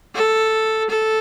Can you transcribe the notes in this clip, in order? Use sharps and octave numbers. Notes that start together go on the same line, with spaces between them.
A4
A4